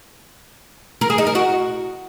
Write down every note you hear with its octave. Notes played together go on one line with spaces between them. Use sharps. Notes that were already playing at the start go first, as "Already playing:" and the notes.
A#4
G#4
D#4
A#4
F#4